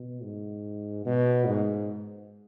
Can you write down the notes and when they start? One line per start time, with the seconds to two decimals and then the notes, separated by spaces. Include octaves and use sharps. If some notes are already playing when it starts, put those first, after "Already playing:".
Already playing: B2
0.23 G#2
1.05 B2
1.46 G#2